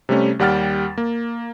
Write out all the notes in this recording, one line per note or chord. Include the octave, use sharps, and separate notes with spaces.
C3 G3 A3 C#4
D#2 G3 F#5 G5 F6 A6
A#3